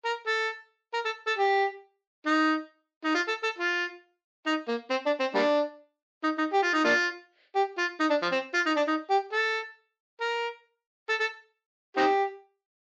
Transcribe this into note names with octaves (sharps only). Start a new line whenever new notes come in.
A#4
A4
A#4
A4
A4
G4
D#4
D#4
F4
A4
A4
F4
D#4
A#3
C4
D4
C4
G3 A#3 D4
D#4
D#4
G4
F4
D#4
A#3 D4 F4
G4
F4
D#4
D4
F3
C4
F4
D#4
D4
D#4
G4
A4
A#4
A4
A4
C4 D#4 G4